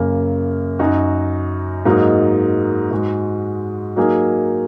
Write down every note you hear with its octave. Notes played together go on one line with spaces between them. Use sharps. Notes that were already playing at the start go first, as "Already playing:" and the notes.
Already playing: F#2 C#3 A#3
F#2 F#3 D#4 F#4
G#2 F#3 A#3 D#4
G#2 G#3 F#4
F#3 A#3 D#4 G#4